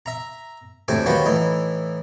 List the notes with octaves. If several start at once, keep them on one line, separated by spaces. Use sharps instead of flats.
E5 A#5
D2 A2 C3 A3 G5 G#5
D#3 F3 F#3 B3 F#4 G4
A2 E3 D#4